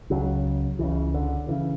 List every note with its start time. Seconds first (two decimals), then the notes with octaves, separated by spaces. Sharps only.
0.10 C#2 C#3 F#3
0.79 C#2 C#3 E3
1.14 D3
1.48 C#3 E3